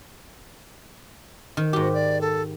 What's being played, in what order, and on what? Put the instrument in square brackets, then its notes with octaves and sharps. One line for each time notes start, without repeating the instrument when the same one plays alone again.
[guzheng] D#3
[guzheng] G#2 G4 [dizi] F#4
[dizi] D5
A4